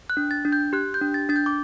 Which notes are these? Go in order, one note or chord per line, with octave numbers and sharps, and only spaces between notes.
F#6
D4
A6
D4
G6
G4 F#6
G6
D4
A6
D4 A6
G6
D6